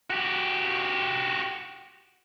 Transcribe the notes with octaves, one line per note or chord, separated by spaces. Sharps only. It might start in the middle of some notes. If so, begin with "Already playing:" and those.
F#4 G4